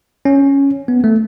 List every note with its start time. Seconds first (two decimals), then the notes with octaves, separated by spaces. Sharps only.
0.25 C#4
0.88 B3
1.04 A3